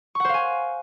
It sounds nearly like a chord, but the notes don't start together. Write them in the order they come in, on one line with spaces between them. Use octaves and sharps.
C#6 F#5 C5 F5 G#5